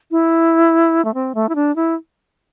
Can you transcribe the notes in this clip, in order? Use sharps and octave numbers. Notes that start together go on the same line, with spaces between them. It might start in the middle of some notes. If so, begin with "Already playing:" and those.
E4
A3
C4
A3
E4
D4
E4